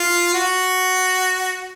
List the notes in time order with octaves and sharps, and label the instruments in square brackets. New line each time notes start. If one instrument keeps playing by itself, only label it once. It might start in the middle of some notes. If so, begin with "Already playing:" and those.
Already playing: [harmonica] F4
F#4